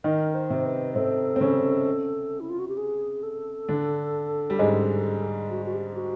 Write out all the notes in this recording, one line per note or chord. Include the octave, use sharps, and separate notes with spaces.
D#3 D#4 A#4
C5
C3 C4
B4
C3 C4 A4
C4
C#3 C#4
E4
F4
F#4
G4
G#4
A4
D3 D4
G3
G#2 G#3
F#4
F#4
G4
F#4